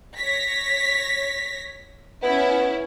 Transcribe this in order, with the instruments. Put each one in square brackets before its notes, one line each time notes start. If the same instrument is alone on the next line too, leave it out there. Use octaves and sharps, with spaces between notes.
[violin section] C#5 A#6 B6
[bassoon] B3 [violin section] C#4 E4